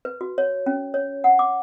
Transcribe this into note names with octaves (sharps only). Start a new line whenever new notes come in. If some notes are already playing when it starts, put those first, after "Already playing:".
B4
F#4
C#5
C#4
C#5
F#5
D6